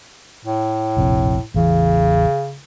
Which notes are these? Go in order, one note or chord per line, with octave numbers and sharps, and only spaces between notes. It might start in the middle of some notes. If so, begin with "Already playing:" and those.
A2
F1 A#1 C3
A1 E2 C#3 E3